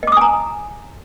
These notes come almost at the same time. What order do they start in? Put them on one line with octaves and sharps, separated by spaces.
D#5 D6 D#6 G#5 A#5